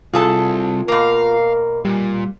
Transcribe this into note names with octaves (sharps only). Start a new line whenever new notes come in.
C2 F4 G#4 A4 A5
B2 A#3 A#4 F5
A#2 G3